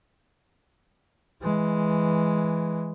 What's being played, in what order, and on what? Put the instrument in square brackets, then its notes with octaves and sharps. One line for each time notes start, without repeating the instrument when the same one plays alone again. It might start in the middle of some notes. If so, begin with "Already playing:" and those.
[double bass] E3 G#3